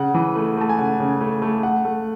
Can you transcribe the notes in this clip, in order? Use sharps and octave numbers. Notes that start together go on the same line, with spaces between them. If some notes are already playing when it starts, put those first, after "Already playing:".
Already playing: C#3 F#5
E3
A3
A3 A5
G#5
C#3 F#5
C#3
A3
A3
A3 F#5
A3